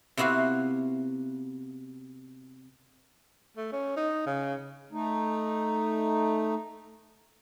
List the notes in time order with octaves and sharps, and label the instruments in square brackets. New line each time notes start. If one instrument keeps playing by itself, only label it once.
[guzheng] C3 B3 E4 F#4 F5
[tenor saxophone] A3
C#4
D#4
C#3
[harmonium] A3 D#4